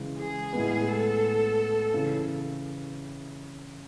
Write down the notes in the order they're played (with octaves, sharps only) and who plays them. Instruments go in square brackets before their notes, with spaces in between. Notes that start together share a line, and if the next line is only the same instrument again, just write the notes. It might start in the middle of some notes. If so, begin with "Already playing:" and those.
Already playing: [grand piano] C#3 E3 G#3
[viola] G#4
[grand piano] A2 G#3 B3
[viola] A4
[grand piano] C#3 E3